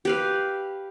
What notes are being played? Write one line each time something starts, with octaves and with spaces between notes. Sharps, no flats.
G4 B4 F5